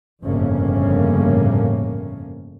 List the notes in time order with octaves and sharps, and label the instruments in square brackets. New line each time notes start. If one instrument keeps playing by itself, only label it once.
[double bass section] G1 F2 A2 C#3 A#3 C#4